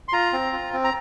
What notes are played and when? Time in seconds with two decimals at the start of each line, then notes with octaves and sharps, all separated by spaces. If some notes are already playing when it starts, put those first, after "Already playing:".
0.08 C6
0.13 F4 A#5
0.33 C4
0.53 F4
0.73 C4
0.84 A#5